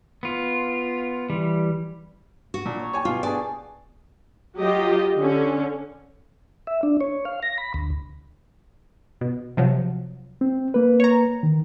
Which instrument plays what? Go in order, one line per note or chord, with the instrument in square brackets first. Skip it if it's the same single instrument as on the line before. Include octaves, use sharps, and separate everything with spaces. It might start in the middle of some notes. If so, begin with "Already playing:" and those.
[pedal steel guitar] B3 F4
E3 G3
[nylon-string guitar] F#4
[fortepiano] A#2 [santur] D4
[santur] C#5
[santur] G4 [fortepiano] C#5 G#5 A5
[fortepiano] B2 [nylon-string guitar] F4
[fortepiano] B3 D4 A5 [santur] G#4 [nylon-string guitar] D5
[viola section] F#3 F4 G4 D#5
D3 C#4
[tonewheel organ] E5
D4
C#5
F5
A#6
B5
D2
[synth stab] B2
C3 F3 F#3
[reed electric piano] C4
A#3 B4
[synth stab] C#5 A#5
[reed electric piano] D#3